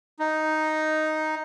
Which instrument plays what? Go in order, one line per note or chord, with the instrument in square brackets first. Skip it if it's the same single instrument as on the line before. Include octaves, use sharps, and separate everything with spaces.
[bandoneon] D#4